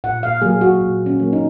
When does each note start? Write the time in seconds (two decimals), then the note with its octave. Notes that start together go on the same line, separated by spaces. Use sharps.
0.04 A#2 F#5
0.23 F5
0.42 F#3 A#3 G#4
0.61 F#4
0.81 A#2
1.06 C#4
1.19 F#3 A#3
1.33 D#4